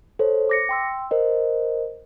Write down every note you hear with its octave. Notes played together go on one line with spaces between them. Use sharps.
A4 C5 C#5
D6 A#6 C#7
G5 C6 E6
A#4 C5 D#5